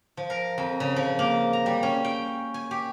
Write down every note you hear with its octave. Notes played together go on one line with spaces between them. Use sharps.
F3
A#4
F2
C#3
F3
A#3
A#5
G3
C#4
G5
G#5
G4